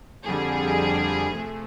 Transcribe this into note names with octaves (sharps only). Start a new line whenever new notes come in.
F2 D3 G3 G#4
C3 F3 A3